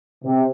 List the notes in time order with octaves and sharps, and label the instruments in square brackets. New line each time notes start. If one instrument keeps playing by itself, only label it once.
[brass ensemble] C3